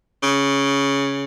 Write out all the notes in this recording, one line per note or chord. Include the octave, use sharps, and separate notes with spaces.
C#3